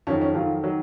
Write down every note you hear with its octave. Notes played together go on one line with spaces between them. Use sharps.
F2 D#3 F#3 C#4
C#4
F2 D#3 F#3 F4
D#3 F#3